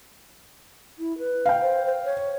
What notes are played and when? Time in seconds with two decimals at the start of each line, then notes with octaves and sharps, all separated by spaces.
0.99 E4
1.19 B4
1.46 F5 G5
1.61 C5
1.86 C5
2.04 C#5